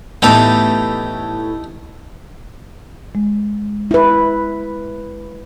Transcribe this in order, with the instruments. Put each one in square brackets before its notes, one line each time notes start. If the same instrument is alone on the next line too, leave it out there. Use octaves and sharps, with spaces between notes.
[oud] A2 E3 [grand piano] B3 F7 [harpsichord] D#4 G4 A4
[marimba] G#3
[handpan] E4 B4